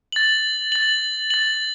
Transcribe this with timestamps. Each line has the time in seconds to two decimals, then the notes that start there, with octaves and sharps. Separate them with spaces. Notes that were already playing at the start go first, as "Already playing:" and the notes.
0.12 A6 F#7
0.72 A6 F#7
1.30 A6 F#7